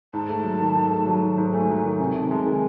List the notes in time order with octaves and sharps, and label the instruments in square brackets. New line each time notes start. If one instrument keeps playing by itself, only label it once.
[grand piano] G#2 [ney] A5
[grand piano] A3
F#3
D#3
G#2
A3
F#3
D#3
G#2
[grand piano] A3 [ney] G#5
[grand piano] F#3
D#3
[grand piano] C3 [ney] G#5
[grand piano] C3 [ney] A5
[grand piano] G#3 [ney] A5
[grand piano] D#3 [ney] G#5